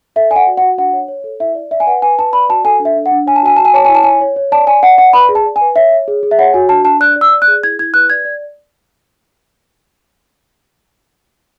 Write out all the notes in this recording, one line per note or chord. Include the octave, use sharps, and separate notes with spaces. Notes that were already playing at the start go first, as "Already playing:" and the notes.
A4 E5
D5 G#5
F#5
F#4
F#5
F#4
D4 F#5
C#5
C#5
A4
E4 E5
D5
D5 E5
G#5
B4 F#5
B4 G#5
B4 A5
D5 B5
F#4 A5
A4 G#5
D4
E5
D4
F#5
D4
C#5 G#5
A5
F#4 G#5
F#4 A5
G#5
C#5 A5
E4 G#5
A5
C#5 G#5
C#5
C#5
D5 A5
D5 G#5
D5 F#5
D5 F#5
B4 B5
G#4
A5
D5
G#5
B4
C#5 E5
C#5
G#4
G#4
E5
C#5 F#5
F#4 G#5
D4 A5
D4 A5
D5 F#6
D5
E6
D5
F#6
G#4
E4 G#6
E4 G#6
B4 F#6
D5 G#6
D5